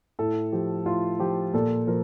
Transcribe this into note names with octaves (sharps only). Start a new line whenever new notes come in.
A2 A4
F3 G4
A2 F4
F3 G4
A#2 A4
F3 A#4